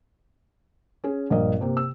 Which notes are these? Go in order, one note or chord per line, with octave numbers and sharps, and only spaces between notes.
C#4 G#4
A#1 G2 A#4 D#5
C3 A#3 G4
E6